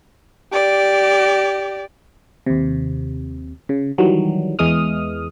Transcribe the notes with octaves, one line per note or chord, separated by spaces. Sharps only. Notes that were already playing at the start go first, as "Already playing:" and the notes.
G4 D5
D#2 C3
C#3
D#3 E3 F#3 G3
E2 E3 G#3 D#6 F6